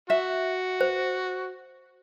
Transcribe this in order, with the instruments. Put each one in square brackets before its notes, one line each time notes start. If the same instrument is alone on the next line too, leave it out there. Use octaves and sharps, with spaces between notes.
[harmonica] F#4 [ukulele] E5
[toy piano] C5